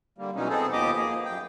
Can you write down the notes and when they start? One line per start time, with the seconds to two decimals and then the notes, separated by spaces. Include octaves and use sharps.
0.18 D3 G3 A#3
0.36 B2 E3 F#3 G#3 C#4 D#4
0.49 B3 C4 D#4 G#4 A4
0.72 D#2 F3 B3 G4 D#5 D6
0.97 F3 A#3 G#4
1.25 F#2 G5